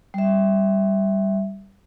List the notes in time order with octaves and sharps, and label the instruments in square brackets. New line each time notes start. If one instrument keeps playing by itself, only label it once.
[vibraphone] G3 E5